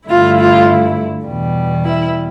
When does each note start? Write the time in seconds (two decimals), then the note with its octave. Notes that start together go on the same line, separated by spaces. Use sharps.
0.09 G2 D3 A3 E4 F4
0.39 F4
1.26 E2 B2 G3
1.84 E4